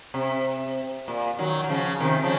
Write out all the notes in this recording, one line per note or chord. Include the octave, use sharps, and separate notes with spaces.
C3
A#2
D#3 F#3
F#3
C#3 F3
C3 D#3
C#3 F3